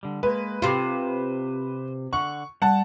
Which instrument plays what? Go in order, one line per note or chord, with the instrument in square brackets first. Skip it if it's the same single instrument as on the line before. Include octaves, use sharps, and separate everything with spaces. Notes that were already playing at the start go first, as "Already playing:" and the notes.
[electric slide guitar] D3 G3
[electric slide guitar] G#3 A#3 [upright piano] B4
[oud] C3 F4 [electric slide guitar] C5
[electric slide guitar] D3 F#5 [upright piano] C#6
[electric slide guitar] G3 [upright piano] F#5 A5